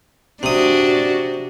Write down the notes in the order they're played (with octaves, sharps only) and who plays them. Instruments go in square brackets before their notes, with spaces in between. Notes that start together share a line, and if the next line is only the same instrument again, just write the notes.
[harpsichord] C3 D#6 [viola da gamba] D4 F#4